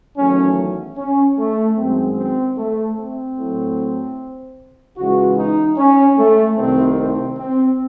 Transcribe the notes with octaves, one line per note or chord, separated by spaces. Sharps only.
E2 D#3 F#3 A3 C#4
C#4
A3
F#2 D#3 G#3 C4
C4
A3
C4
A2 F#3 A3
C#2 C#3 E3 G#3 F#4
D#4
C#4
A3
C2 C3 D#3 A3 C4
C4
C4